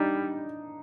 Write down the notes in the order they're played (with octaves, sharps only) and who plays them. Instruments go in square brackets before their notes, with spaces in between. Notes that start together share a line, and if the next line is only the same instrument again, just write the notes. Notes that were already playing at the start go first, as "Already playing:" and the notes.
Already playing: [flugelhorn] G3 [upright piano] D4 D#4